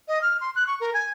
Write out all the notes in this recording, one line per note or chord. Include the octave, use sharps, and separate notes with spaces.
D#5
F6
C6
F#6
C#6
A#4
G#5